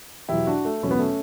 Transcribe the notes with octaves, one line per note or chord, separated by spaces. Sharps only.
E2 B2 F#3 E4 G4
D4 F#4
A3
E2 B2 F#3 C#4
B3
A3 C#4